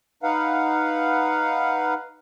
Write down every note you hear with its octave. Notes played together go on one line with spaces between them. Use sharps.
D#4 B4 F5 F#5